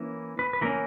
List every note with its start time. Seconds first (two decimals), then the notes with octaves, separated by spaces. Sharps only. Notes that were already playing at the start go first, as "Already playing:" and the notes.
Already playing: E3 A#3 C#4
0.39 B4
0.53 B4
0.61 E3 A#3 C#4 A#4